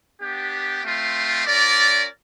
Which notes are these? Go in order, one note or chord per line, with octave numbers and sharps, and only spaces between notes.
B3 D4 G4
A3 C4 F4
C#4 F4 A#4 D5